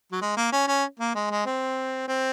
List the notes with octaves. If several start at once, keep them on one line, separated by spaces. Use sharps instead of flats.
F#3
G#3
A#3
C#4
C#4
A#3
G#3
G#3
C4
C4